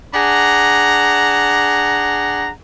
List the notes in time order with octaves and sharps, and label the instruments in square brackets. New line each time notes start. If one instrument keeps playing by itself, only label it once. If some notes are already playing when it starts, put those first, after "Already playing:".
[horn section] D4 G#4 F#5 A#5